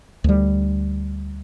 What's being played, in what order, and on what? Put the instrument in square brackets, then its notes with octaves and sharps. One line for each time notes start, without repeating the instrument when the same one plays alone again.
[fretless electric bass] D2 G3